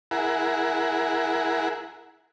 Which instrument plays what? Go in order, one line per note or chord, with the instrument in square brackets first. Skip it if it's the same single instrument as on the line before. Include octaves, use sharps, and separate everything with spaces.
[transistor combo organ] E4 G#4 A#4 F#5